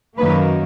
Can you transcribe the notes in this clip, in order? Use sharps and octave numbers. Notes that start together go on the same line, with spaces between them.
F#2 D#3 F#3 A#3 B4